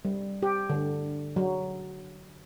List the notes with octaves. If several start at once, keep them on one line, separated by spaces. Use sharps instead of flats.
G3
G4
D3
F#3